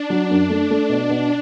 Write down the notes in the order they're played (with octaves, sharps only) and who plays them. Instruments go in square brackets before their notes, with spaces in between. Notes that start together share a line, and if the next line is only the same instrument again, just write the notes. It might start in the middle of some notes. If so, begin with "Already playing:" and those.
Already playing: [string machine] D4
[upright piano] F#3
F#2
A3
A3
B2
B2